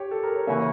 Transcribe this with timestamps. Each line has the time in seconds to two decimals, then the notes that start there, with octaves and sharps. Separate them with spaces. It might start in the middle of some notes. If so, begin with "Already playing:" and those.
Already playing: G4 C#5
0.11 A4
0.23 A#4
0.36 C#5
0.47 C#3 E3 A#3 C#4 E5